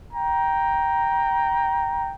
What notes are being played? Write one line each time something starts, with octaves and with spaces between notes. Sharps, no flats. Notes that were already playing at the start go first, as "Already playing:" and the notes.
G5 A#5